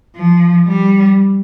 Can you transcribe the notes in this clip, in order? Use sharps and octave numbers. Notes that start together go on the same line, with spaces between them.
F3
G3